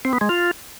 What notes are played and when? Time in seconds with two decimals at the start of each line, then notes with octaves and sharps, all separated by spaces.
0.05 C4
0.13 B3
0.21 G#3
0.29 F4